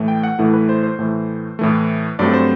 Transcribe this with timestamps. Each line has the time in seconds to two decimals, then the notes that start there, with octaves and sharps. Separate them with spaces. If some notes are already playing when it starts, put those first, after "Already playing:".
Already playing: A2 E3 A3
0.08 G5
0.23 F#5
0.39 A2 E3 A3
0.53 B4
0.69 C5
0.83 C5
0.99 A2 E3 A3
1.59 A2 E3 A3
2.19 G2 F#3 A3 C4 D5
2.34 C5